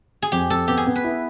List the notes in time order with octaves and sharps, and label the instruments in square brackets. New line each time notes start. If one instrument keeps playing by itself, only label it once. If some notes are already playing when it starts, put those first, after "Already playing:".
[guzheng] G#4
[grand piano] F2 [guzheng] G4
[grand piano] F2 [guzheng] A4
[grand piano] B3 [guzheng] G4
[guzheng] G#4
[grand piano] B3
[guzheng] B4
[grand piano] E4